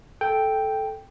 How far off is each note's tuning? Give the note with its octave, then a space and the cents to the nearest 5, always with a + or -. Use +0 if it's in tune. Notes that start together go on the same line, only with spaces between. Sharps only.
A4 -10 G5 +0